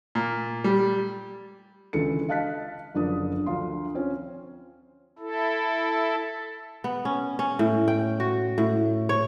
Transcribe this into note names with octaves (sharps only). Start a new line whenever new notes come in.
A#2
G3
C#2 D3 E3 E4 A4 C#7
D#5 F5 A5 F#6 B6
F#1 D3 F3 D4 D#6
D2 F3 F5 C6
C4 C#4 F4
E4 A4
B3
C#4
C#4
A2
G5
F#4
A2
C#5